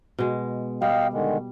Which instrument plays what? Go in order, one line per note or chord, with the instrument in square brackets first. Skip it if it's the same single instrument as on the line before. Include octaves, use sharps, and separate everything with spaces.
[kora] B2 G#3
[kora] G3 [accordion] D#5 F5 G5
[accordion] D3 D#3 G#3